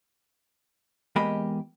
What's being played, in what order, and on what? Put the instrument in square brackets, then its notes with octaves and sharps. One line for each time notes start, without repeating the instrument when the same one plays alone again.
[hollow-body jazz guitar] E2 G#3 A#3 G4 D#5 B5